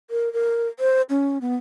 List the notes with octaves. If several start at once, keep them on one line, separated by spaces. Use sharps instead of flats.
A#4
A#4
C5
C#4
B3